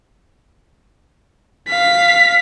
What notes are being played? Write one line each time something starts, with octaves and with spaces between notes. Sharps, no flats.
F5 B6